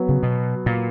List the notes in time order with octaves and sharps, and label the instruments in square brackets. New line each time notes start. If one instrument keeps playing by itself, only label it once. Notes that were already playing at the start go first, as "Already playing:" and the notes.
Already playing: [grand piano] F#3 B3
[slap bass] C#3
B2
A#2